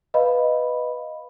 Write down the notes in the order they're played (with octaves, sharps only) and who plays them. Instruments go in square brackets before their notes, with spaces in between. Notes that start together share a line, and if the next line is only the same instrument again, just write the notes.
[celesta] B4 D#5 F5 B5